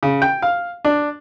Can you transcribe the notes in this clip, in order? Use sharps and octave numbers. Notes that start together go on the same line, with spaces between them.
C#3
G5
F5
D4